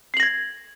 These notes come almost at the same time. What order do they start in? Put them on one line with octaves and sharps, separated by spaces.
C7 F#7 A#6 G#6